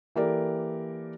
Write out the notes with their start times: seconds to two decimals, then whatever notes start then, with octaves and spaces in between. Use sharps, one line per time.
0.16 E3 A#3 G4 A4 A#4 D5